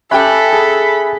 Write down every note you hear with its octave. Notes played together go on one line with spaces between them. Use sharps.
C#4 G4 A4 E5 G5 G#5 B5 F#6
G#4